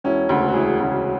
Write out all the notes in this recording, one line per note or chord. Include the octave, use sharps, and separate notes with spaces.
E1 C#4 E4
D2 C#3
F#4
E1 E4 G#4
D2 C#3